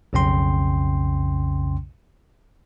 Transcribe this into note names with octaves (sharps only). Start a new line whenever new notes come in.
B1 F2 C#3 C#4 G5 C6